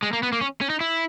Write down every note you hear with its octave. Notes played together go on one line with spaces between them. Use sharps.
G#3
A#3
B3
A#3
C#4
C#4
D#4
E4